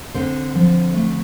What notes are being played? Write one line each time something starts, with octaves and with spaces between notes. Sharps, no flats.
D3 C4 C5
F3
A3